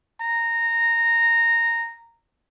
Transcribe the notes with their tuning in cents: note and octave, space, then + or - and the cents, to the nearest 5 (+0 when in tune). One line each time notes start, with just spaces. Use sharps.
A#5 -10